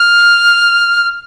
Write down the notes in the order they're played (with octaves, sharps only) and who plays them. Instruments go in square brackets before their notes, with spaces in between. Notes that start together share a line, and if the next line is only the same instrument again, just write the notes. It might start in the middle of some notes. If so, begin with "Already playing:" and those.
Already playing: [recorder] F6